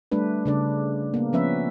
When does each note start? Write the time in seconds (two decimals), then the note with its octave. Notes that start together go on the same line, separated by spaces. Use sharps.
0.12 G3 A3 D4 B4
0.45 C#3 D4 D5
1.14 A#3 B3
1.33 F3 B3 C#4 B4 E5